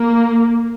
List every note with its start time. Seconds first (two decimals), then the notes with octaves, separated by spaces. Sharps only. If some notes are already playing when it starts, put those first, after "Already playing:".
Already playing: A#3